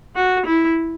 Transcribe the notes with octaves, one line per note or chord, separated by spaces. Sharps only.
F#4
E4